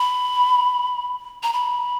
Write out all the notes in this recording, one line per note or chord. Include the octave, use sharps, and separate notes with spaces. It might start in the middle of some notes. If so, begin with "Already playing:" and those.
Already playing: B5
A#5
B5